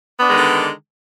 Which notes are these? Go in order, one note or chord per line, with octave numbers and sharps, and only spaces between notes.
D3 D#3 G#3 B3 D4